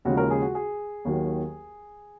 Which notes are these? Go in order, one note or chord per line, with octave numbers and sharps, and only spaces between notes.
D#2 C#3 F3 G#3 F#4
A#4
G#4
F#4
G#4
D#2 D#3 F#3